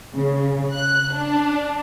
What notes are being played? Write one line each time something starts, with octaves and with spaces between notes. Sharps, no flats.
C#3
F#6
D4